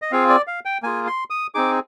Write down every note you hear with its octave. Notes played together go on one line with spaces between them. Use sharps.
D#5
C4 F4 G#4 F5
D5
F5
G5
A#3 F4 G#4 G#5
C6
D#6
C4 D#4 G#4 D6